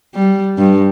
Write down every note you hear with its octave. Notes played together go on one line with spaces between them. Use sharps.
G3
G2